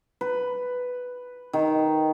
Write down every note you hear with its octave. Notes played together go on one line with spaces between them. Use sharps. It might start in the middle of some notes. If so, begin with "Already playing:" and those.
B4
D#3